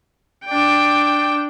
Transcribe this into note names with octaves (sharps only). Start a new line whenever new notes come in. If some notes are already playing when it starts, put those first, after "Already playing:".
D4 G5